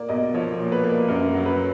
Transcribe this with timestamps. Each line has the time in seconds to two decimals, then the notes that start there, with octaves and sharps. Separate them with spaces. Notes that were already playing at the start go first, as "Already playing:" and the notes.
Already playing: A#2 A#3 D5
0.09 B1 D#5
0.34 F3 C#5
0.59 A#2
0.72 B4
0.83 A#3
1.08 F#2 A#4
1.34 F#3
1.46 B4